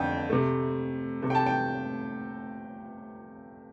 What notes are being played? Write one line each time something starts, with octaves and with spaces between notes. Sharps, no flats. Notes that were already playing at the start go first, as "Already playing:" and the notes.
Already playing: F2 D3 G5
C3 A3
C3 A3
G5
A5
G5